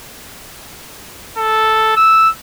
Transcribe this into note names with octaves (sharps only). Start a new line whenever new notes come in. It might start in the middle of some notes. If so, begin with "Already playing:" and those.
A4
E6